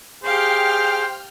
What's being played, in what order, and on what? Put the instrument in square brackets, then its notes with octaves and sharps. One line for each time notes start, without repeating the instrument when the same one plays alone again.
[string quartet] G4 F5 [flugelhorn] G#4 [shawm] C5 [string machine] G5 F6